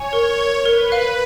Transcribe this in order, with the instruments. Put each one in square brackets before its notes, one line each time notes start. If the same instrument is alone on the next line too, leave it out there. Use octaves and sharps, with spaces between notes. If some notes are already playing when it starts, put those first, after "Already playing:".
Already playing: [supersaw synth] C#5 [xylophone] G#5
[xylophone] A#4
A#4
[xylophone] A#4 [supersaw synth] B4
[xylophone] F5